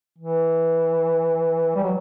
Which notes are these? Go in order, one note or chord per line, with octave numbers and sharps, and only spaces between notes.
E3
G3
F#3